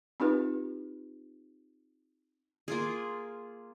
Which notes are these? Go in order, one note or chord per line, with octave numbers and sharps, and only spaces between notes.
C4 D#4 F4 G4 B4
A#3 F4 G#4